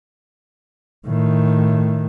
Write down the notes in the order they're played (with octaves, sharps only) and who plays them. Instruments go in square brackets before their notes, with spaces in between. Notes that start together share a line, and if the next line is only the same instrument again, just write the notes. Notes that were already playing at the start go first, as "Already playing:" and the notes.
[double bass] A2 D#3